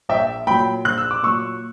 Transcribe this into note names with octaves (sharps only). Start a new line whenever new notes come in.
A#1 E5 G5
A#2 F#3 G5 B5
A#1 F#6
E6
D6
A#2 F#3 C#6 E6